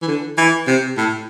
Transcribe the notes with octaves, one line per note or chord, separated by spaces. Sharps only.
E3
D3
E3
C3
A2